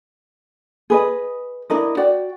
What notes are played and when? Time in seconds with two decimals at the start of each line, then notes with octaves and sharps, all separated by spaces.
0.90 G#4 B4 D#5
1.70 D4 E4 A#4 D#5
1.97 F#4 D5 G5